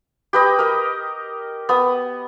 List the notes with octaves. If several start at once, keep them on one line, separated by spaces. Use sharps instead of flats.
G4 B4 D#5
A#4 D#5
B3 D#6